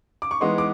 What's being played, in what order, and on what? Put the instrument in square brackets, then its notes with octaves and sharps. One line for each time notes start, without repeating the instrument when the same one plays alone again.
[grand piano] D6
C#6
E3 G#3 B3 D#4 C6
D6